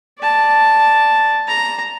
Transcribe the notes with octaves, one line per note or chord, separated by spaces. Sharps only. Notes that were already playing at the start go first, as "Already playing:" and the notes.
D5 A5
A#5